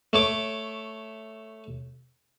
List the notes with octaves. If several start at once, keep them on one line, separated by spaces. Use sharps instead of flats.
A3 C#5 D6